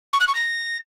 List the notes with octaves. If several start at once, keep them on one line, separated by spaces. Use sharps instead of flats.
C#6
F#6
C#6
A#6